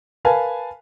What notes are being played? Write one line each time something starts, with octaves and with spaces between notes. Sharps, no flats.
A#4 B4 F5 G#5 A5